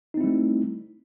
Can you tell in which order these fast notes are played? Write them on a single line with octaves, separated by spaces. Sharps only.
D#4 C4 E4 G3 A3